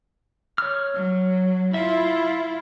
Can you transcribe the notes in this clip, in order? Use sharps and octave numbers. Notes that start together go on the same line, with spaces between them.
C#5 F6
F#3
E4 F4 E5